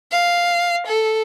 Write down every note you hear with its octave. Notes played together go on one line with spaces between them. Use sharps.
F5
A4